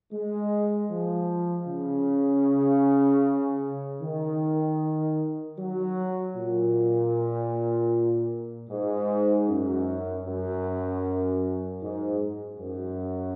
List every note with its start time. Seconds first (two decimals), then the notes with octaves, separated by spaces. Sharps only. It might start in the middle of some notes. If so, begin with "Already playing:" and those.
0.13 G#3
0.91 F3
1.68 C#3
4.02 D#3
5.59 F#3
6.36 A#2
8.70 G#2
9.48 F#2
10.26 F#2
11.82 G#2
12.60 F#2